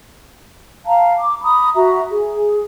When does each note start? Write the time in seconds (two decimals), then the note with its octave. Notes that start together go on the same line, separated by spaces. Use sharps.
0.86 F5 A5 A#5
1.18 D6
1.43 A#5 B5 D#6
1.75 F#4 E5 A#5
2.11 G#4